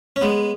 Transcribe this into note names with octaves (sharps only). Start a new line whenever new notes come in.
C#4
G#3 B3